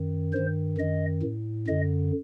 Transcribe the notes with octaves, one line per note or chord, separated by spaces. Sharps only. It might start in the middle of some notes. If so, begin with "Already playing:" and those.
Already playing: F#2 D#3
G2 D#3 C5
F#2 D#3 D#5
A2
F#2 D3 D#5